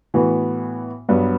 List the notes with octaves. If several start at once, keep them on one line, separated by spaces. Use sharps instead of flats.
A2 E3 B3 F#4
G2 F#3 B3